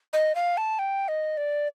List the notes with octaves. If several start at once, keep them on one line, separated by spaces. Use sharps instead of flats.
D#5
F5
A5
G5
D#5
D5